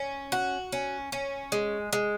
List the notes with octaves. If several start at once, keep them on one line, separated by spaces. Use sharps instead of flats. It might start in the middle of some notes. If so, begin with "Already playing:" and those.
Already playing: C#4
F#4
C#4
C#4
G#3
G#3